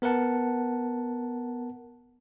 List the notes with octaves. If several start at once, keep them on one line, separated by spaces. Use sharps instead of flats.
B3 A#4 B4 F#5 A5